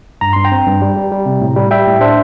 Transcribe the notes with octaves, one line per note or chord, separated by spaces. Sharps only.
G2 A#5
G2 C6
G5 A#5
C4
G2
G3
G3
G3
C3
A2
G3
G3 E5 G5
A2
D4 C5 E5